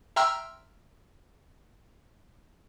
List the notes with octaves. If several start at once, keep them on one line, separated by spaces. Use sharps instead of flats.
E5 G5 A#5 C6 E6 F6